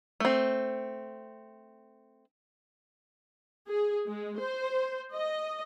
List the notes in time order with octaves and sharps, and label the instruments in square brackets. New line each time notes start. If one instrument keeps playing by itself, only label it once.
[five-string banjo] A3 C4
[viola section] G#4
G#3
C5
D#5